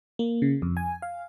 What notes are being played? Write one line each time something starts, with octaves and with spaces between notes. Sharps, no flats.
A#3
C#3
F2
G#5
F5